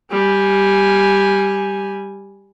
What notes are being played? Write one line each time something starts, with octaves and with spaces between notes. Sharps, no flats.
G3 G#5